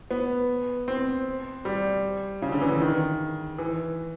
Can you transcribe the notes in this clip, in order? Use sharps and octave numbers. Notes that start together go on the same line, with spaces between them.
B3
C4
G3
C#3
D3
E3
D3
D#3
E3